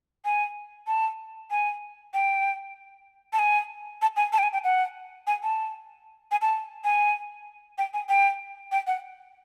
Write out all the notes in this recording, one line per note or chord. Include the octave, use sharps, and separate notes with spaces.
G#5
A5
G#5
G5
A5
G#5
A5
G#5
A5
G5
G#5
G5
F#5
G#5
A5
G#5
A5
G#5
G5
G#5
G5
G5
F#5